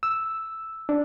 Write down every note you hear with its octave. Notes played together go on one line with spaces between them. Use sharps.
E6
D4